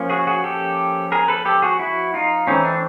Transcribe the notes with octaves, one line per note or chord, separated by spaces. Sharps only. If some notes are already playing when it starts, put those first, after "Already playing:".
Already playing: F3 A#3 C#4
F#4 G#4
F#4 G#4
G4 A4
G#4 A#4
A4 B4
G4 A4
F#4 G#4
E4 F#4
D#4 F4
E3 A3 C4 C#4 D#4
D4